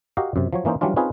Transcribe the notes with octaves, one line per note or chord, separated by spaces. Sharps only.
F#4 G4 A#4 D#5 F5
F#2 C3
F3 F#3 C#5
E3 A#3 C#4 D#4 C5
E3 F#3 G3 C#4 D4 F4
C4 C#4 D#4 F4 G#4 B4